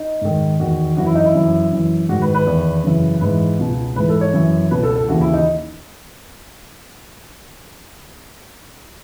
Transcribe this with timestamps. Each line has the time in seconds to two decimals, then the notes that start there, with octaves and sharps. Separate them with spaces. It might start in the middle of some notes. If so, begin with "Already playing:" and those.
Already playing: D#4
0.21 G#2 D#3
0.60 E2 D#3 F#4
0.97 F#2 E3 F#4
1.06 E4
1.15 D#4
1.25 E4
1.34 F#2 E3
1.72 F#2 E3
2.09 G#2 D#3 F#4
2.22 B4
2.35 B4
2.46 E2 D#3
2.84 F#2 C#3 E3
3.21 G#2 E3 B4
3.59 C#2 B2
3.96 G#2 E3 B4
4.09 A4
4.21 C#5
4.33 F#2 E3
4.71 C#2 B2 B4
4.83 A4
4.96 A4
5.08 D#2 C#3 E3 F#4
5.21 E4
5.34 D#4